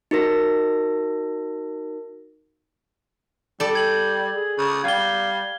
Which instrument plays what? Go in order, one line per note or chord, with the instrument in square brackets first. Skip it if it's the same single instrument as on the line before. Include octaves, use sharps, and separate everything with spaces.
[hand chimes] D#4 F#4 A#4 A#6
[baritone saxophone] G3 [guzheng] A4 D5
[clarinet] G5 [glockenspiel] G#6 F#7
[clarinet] G#4
[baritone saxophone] C#3
[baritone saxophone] G3 [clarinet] F5 [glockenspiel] G#6 G7